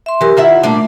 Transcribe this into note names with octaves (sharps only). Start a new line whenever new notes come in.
E5 C6
F#2 E3 G4 A#4
D#3 E4 F4 E5 F#5
A#2 G3 A3 D4 A5